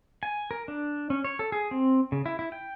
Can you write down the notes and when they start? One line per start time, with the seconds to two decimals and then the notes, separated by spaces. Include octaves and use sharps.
0.23 G#5
0.51 A#4
0.68 D4
1.10 C#4
1.24 C#5
1.39 A4
1.52 G#4
1.71 C4
2.12 C#3
2.26 E4
2.39 E4
2.52 G5